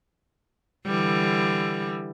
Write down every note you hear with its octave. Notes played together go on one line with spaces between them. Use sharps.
D3 E3 G3